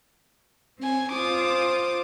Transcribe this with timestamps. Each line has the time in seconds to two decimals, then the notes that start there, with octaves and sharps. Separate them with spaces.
0.80 C4 G#5
1.12 F4 C5 D6 D#6